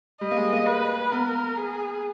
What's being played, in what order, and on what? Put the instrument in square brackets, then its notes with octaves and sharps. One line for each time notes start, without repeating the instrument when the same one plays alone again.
[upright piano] G3 [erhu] D#5
[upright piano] A#3
G#3
A#3
[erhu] B4
[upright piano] B3 [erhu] A#4
[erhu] G#4